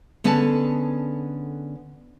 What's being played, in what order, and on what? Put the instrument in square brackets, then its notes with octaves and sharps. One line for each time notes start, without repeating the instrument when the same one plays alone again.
[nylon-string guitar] D3 B3 C#4 G#4 A4 A5